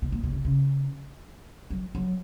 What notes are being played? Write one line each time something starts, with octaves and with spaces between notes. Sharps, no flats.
B2
A#2
B2
C3
C#3
F#3
F#3